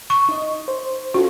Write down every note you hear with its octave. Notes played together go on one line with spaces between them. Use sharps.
C#6
D#4 D#5
C5
C#4 F4 F#4 A4